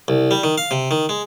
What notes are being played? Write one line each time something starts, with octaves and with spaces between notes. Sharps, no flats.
C2
G3
D#3
F5
C3
D#3
G#3